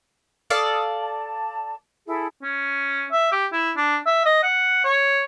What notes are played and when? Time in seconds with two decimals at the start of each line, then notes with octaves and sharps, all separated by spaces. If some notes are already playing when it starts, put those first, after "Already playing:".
0.50 A4 D5 F5 D#6
1.01 A5
2.07 E4 G#4 A4
2.42 C#4
3.12 E5
3.32 G4
3.53 E4
3.77 D4
4.06 E5
4.25 D#5
4.43 F#5
4.84 C#5